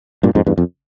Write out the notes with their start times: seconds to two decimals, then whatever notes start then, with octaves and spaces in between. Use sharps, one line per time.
0.23 G2 A#2
0.35 F2 G#2
0.47 E2 G2
0.58 F2